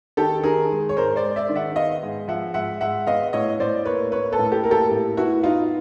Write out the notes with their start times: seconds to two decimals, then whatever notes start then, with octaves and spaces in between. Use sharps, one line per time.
0.17 D#3 G4 A4
0.43 D#3 G#4 A#4
0.71 G#3
0.89 C#5
0.96 G#2 A#4 C5
1.16 C5 D5
1.23 G#3
1.36 D5 E5
1.50 D#3
1.56 E5 F#5
1.76 B3 D#5 F5
2.03 G#2
2.28 F3 E5 F#5
2.54 G#2 E5 F#5
2.81 G#2 E5 F#5
3.07 B3 D#5 F5
3.33 A2 C#5 D#5
3.59 A2 C5 D5
3.85 A#3 B4 C#5
4.12 A#3 B4 C#5
4.32 A4 B4
4.39 A2
4.52 G4 A4
4.64 A#3 A#4
4.71 G4 A4
4.91 A2
5.17 B3 E4 F#4
5.43 B3 D#4 F4